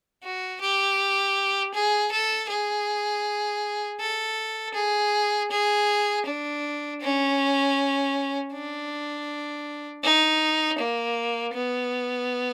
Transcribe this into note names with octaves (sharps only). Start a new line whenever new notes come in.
F#4
G4
G#4
A4
G#4
A4
G#4
G#4
D4
C#4
D4
D#4
A#3
B3